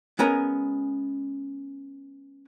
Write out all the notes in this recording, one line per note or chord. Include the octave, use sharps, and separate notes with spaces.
G#3 B3 C#4 A#4 G#5 A#5